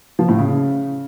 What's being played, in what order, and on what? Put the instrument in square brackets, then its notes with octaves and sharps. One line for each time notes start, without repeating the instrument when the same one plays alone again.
[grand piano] F3
A2
C#3